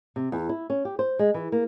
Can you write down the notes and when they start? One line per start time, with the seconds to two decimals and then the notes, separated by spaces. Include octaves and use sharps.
0.16 C3
0.32 E2
0.49 E4
0.70 C#4
0.85 G4
0.99 C5
1.19 G#3
1.34 E3
1.52 A#3